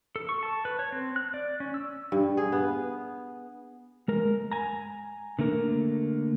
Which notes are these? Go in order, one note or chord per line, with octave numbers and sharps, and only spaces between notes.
A4
C#6
A5
B4
C#5
C4
F#6
D5
C#4
E6
G2
G#4
B3
G#3 A#4
G#5 A#5
D3 A3 A#3 A#4